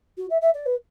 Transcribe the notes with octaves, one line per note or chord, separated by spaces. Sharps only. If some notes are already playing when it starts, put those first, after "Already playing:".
F#4
E5
E5
D5
B4